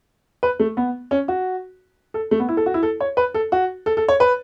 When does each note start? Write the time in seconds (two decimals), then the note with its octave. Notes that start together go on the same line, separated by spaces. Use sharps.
0.43 B4
0.60 A3
0.77 B3
1.11 C#4
1.28 F#4
2.14 A4
2.31 A3
2.40 B3
2.49 E4
2.57 A4
2.66 F#4
2.74 E4
2.83 A4
3.00 C#5
3.17 B4
3.34 A4
3.52 F#4
3.86 A4
3.97 A4
4.08 C#5
4.20 B4